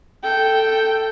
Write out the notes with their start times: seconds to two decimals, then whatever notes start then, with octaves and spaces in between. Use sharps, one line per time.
0.23 A4 G5